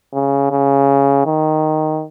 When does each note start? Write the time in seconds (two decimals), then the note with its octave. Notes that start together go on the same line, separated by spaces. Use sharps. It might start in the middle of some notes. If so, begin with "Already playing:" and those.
0.13 C#3
0.51 C#3
1.26 D#3